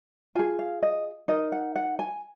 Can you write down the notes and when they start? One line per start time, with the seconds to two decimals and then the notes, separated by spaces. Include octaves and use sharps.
0.35 F4 G#4 G#5
0.59 F5
0.83 D#5
1.28 D#4 A#4 D#5
1.52 F#5
1.76 F#5
1.99 G#5